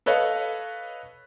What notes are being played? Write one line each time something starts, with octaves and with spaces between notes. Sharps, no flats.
A4 B4 C#5 D#5 F5